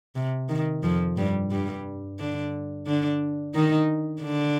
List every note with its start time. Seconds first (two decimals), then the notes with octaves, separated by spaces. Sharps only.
0.15 C3
0.49 D#3
0.83 F2 F3
1.17 G2 G3
1.51 G2 G3
2.19 D3 D4
2.87 D3 D4
3.55 D#3 D#4
4.22 D3 D4